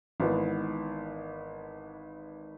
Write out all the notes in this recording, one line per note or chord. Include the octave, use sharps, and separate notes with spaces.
G#1 G#2 E3 G#3 B3